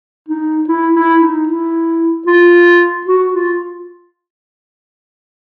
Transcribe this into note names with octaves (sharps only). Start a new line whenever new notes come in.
D#4
E4
E4
D#4
E4
F4
F#4
F4